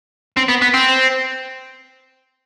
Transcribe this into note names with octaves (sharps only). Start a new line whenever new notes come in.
C4
B3
B3
C4